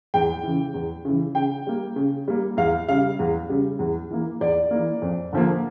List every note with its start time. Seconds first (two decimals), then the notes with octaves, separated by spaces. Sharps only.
0.14 E2 G5
0.43 C#3 E3
0.74 E2
1.05 C#3 E3
1.35 C#3 G5
1.67 G3 A#3
1.96 C#3
2.28 G3 A#3
2.57 E2 F5
2.88 C#3 G3 F5
3.19 E2
3.49 C#3 G3
3.79 E2
4.11 E3 A#3
4.40 E2 D5
4.71 E3 A#3
5.02 F2
5.33 D3 F3 A#3